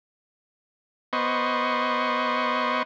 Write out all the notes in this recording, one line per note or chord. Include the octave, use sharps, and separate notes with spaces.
B3 C5 D#5 C#6